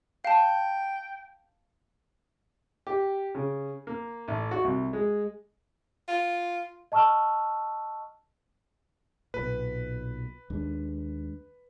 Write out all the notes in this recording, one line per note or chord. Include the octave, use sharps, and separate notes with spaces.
F5 G5 A5
G4
C#3
A#3
A1
F#4
C2
G#3
F4
D#5 A5 C#6 E6 F6
B1 A#2 B4
D#2 G#3 D4